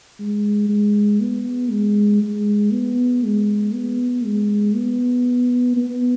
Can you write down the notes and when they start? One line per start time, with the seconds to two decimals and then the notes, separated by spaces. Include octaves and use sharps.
0.19 G#3
0.69 G#3
1.20 B3
1.70 G#3
2.22 G#3
2.72 B3
3.24 G#3
3.74 B3
4.24 G#3
4.75 B3
5.77 B3